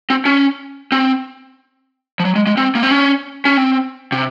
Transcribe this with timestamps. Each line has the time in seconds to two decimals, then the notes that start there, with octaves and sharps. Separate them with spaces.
0.10 C4
0.25 C#4
0.92 C4
2.20 F3
2.25 F#3
2.36 G#3
2.47 G#3
2.57 C4
2.75 A#3
2.83 C4
2.91 C#4
3.45 C#4
3.57 C4
4.12 C3